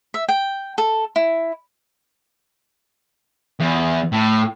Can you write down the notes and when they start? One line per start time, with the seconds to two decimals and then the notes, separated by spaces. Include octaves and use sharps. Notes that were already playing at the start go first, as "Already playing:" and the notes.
0.14 E5
0.29 G5
0.78 A4
1.16 E4
3.60 E2
4.12 A2